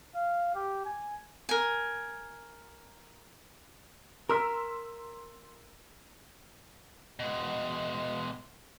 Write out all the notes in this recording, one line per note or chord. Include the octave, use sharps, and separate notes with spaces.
F5
G4
G#5
A#4 G#5
A#4 C6 E6 B6
B2 G#3